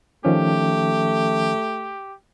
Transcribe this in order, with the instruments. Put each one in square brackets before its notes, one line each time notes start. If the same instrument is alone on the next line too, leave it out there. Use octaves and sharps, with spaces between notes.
[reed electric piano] D#3 F3 C#4 [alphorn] A3 [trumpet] G4